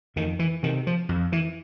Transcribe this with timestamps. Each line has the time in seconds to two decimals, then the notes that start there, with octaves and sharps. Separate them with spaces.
0.16 F2 D#3
0.39 E3
0.63 C3 D#3
0.87 F3
1.09 F2
1.32 E3